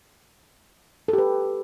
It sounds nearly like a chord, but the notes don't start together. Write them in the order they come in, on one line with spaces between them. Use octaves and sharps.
A4 G4 B4